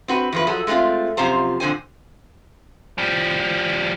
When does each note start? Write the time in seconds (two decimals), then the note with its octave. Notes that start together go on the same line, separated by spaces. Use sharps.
0.08 C4 F#4 B4
0.32 E2 F3 B4
0.47 F3 F#3 G#4 A4
0.67 G#3 A3 B3 C4 F4
1.17 F#2 C3 F3 F4 C5 A#5
1.60 F2 A#2 D3 C5 G#5
2.98 F3 G3